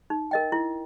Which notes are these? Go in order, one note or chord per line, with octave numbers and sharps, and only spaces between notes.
D#4
A#4 D#5 G5
E4